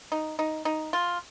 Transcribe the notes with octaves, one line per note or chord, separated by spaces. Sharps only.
D#4
D#4
D#4
F4